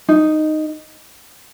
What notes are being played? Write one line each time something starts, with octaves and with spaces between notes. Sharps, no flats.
D#4